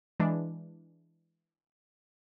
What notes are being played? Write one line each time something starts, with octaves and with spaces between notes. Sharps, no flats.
E3 G#3 D4